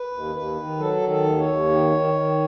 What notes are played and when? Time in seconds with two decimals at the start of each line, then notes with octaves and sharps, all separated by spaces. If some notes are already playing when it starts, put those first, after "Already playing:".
Already playing: B4
0.13 D#2
0.35 D#2 B4
0.57 D#3
0.79 F#3 A4
1.02 D#3
1.09 A4
1.24 D#2
1.38 C#5
1.46 D#2
1.69 D#3
1.91 D#3
2.13 D#3